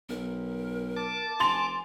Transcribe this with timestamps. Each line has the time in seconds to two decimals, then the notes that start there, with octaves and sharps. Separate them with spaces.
0.09 B1 A#4
0.97 A5 D6
1.40 F1 G#5 C6 A6 F7